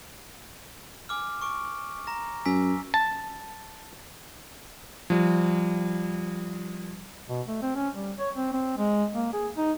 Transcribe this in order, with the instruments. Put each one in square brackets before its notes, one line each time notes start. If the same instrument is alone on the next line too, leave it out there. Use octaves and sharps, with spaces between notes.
[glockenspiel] G#5 D6 F6
C#6 D6 D7
A#5 A#6
[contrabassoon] F#2 [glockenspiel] G#5 E6 B6
[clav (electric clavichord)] A5
[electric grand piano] F3 G3
[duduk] B2
A3
C4
C#4
G3
C#5
C4
C4
G#3
A#3
G#4
D#4